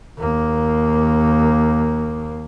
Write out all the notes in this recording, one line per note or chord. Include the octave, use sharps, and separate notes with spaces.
D#2 A#3